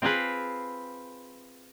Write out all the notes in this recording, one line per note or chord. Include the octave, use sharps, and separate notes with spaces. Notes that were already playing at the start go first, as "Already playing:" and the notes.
C4 F4 G#4 B4